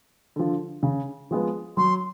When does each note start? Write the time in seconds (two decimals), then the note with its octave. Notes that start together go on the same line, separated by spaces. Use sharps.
0.36 D3 F3
0.83 C#3
1.31 F3 G#3 B3
1.77 F#3 C6